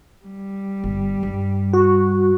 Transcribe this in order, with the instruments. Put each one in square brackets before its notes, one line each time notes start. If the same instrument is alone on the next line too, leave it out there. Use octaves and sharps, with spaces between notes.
[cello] G3
[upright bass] G1
G2
[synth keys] F#4